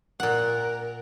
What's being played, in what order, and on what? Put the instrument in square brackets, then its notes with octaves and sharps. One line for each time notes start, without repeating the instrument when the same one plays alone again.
[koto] A#2 F#5 [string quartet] A#4